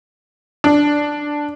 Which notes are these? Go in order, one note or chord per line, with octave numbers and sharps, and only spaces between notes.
D4